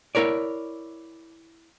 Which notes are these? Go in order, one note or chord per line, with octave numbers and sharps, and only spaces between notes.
E4 A#4 C#5 D5